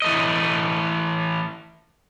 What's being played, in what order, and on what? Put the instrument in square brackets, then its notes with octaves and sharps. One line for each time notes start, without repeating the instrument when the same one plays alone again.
[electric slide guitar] E3 A3 D#5